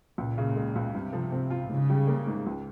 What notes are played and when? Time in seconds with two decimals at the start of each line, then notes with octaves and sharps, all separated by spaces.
0.18 C#2 A#2
0.38 C#3
0.56 G#3
0.76 C#2
0.94 G2 C3
1.13 F3
1.32 C4
1.50 F4
1.69 G#2 C#3
1.90 G3
2.07 A#3
2.27 G#2
2.47 C#2